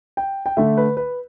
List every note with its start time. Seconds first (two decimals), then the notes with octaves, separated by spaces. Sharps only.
0.17 G5
0.46 G5
0.57 D3 A3 D4 E5
0.77 B4
0.97 B4